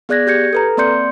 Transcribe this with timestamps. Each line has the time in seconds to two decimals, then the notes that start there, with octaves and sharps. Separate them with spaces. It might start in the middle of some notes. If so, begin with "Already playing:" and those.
0.09 B3 G#4 D5 F#6 G#6 A#6
0.27 G4 G6 G#6 C#7
0.53 A4 B4 A#5
0.77 A#3 C4 D5 C6 G6 C#7